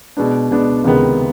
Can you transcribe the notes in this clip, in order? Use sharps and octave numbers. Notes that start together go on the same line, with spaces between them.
B2 G#3 B3 D4
B2 G#3 B3 D4
C#2 C3 D#3 G#3 B3